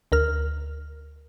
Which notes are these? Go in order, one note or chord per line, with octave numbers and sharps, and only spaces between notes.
D2 A#4 F6